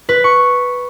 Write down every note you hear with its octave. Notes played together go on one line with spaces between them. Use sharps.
B4
C#6